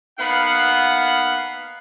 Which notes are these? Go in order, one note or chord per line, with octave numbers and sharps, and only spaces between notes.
A#3 B3 D#4 B4 F5 F#5